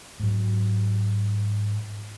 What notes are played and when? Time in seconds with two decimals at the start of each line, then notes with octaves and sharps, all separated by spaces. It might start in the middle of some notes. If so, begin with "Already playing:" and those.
0.20 G#2 F#3